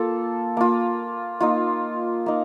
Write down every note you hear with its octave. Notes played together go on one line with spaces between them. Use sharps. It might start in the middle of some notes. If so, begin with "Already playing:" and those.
Already playing: A#3 F4 A4
A#3 F4
A#3 D#4 F4
A#3 D#4